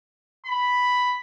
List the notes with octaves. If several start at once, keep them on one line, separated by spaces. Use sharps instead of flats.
B5